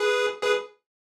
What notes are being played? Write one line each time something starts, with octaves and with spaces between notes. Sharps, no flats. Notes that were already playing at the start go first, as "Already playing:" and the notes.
Already playing: G#4 B4
G#4 B4